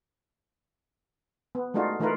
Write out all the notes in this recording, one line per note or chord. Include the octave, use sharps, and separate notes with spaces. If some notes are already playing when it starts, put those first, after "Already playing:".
B3
G#3 A3 D4 D#4 F4 F#4
E3 A3 D#4 F4 A#4 B4